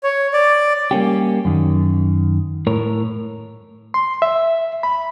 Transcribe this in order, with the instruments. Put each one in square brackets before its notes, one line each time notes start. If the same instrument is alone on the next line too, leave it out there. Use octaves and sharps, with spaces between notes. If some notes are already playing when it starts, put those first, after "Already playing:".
[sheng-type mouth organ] C#5
D5
[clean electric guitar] G3 A#3 C#4 G4
F#2 D#3
A2 A#4 C#5
[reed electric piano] C6
E5
B5